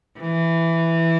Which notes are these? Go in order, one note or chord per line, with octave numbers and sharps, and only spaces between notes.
E3